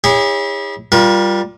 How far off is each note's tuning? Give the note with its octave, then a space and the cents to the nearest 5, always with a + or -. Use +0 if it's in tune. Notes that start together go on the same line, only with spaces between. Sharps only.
E4 -40 G#4 -45 C#5 +0
G3 +0 F4 +0 A#4 +35